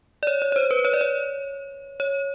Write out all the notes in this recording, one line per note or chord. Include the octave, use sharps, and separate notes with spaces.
D5
C#5
C#5
C#5
C5
B4
C#5
D5
C#5
C#5